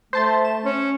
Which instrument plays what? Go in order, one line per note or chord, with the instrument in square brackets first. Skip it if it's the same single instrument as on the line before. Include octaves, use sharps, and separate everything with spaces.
[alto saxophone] A3 [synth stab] C5 A5 C6
[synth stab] E7
[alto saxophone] C#4